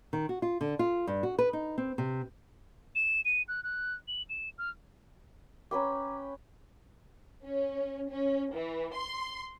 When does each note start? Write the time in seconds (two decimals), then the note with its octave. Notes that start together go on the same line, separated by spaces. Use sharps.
0.13 D#3
0.29 F#4
0.42 F4
0.61 D3
0.79 F4
1.07 G2
1.23 F#4
1.39 B4
1.53 D#4
1.78 C4
1.98 C3
2.95 E7
3.25 D#7
3.48 F#6
3.64 F#6
4.08 F#7
4.30 E7
4.58 F6
5.71 C#4 B4 G5 A#5 D6
7.43 C#4
8.10 C#4
8.54 E3
8.95 C6